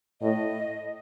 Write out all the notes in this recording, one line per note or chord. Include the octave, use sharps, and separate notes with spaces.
A2 D#5